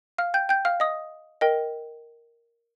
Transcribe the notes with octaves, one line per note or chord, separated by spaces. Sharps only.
F5 F6
G5 G6
G5 G6
F5 F6
D#5 D#6
A#4 D#5 G5